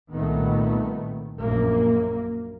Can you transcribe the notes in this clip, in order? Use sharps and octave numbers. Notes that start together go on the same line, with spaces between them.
C2 A#2 D#3 A3 B3
A#1 F#2 A#3